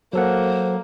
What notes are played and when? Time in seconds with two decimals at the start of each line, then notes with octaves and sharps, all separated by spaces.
0.13 F#3 A#3 A4 C5 F#5